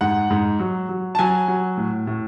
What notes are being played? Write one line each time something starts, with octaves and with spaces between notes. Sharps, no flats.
G#2 F#5
G#2
F#3
F#3
A5
F#3 G#5
F#3
A2
A2